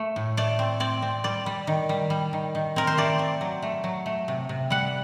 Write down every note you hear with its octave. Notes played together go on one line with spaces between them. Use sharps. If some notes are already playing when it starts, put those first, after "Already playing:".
Already playing: A3
A2
A3 D5
C4
C4 D5
C4
G3 D5
G3
D#3
G3
G3
D#3
D#3
C4 A#4
C5
A3 D5
C4
F#3
A3
F#3
A3
C3
C3
G3 F#5